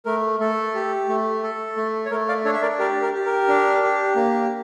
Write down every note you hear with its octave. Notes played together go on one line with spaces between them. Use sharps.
A3 A#4
A3 A4
G4
A3
A4
A3
C#5
A3 A#4
D5 F5
D4 A4 C#5
E5
A#4 D5
G4 A#4 D5
A#4
G4
A#4
D4
G4
A#3